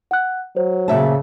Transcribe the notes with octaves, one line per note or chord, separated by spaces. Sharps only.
F#5 F#6
F#3 C5
A#2 C#3 E5 A5